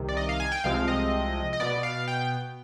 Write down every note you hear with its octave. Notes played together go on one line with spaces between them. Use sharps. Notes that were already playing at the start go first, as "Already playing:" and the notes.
Already playing: C2 C3 D#3
D5
D#5
F5
G#5
G5
C2 C3 F3 G#3 C4 F5
D#5
D#5
B2 B3 D5
F5
G5